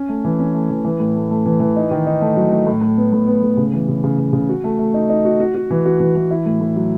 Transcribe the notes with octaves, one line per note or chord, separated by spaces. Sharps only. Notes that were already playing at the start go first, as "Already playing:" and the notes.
Already playing: C#4
A3
E3
C#4
A3
E3
E3
A2
A3
A3
E3
E3
D#4
D#3
D#4
A3
F#3
A3
A2
A2
B3
A2
B3
A2
C#3
E3
C#3
C#3
C#3
C#3
F#4
A3
A3
D#4
D#4
F#4
F#4
F#4
E3
F#4
E3
E3
E4
A2
A2
F#3